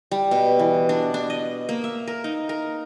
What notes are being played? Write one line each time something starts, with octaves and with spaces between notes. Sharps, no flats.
G3
B2
E3
D4
D4
D#5
A#3
E5
A#4
D#4
A#4